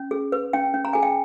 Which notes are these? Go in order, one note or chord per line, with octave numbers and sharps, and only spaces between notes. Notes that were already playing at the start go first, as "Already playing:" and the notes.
Already playing: C#4
G#4
B4
C#4 G5
C#4
A#5
G#4 G#5
G5